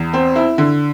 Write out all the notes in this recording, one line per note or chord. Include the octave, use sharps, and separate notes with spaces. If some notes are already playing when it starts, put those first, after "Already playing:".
Already playing: E2
C4
E4
D3